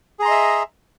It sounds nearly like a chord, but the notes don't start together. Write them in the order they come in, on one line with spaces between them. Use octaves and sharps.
G#4 A#5 C6 D#5 E5